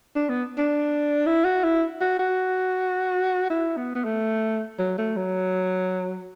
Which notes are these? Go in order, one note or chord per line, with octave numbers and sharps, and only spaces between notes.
D4
B3
D4
E4
F#4
E4
F#4
F#4
E4
B3
B3
A3
F#3
A3
F#3